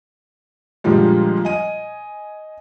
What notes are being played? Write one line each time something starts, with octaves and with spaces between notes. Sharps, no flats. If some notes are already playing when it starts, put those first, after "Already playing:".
A#2 D3 F3 G3 G#3
D#5 G#5 D#7